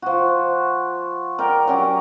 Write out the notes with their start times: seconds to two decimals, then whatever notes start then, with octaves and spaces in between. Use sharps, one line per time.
0.02 F3 F#4
1.39 A#4 D5 G5
1.67 F#3 C#4 G4